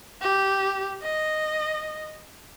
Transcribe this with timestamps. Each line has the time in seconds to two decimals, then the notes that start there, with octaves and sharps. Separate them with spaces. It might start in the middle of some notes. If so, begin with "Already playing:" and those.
0.22 G4
1.02 D#5